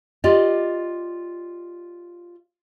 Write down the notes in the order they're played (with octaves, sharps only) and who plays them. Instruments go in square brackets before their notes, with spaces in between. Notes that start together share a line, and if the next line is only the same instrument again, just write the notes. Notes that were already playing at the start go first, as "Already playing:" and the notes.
[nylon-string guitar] F4 G4 D5 D#5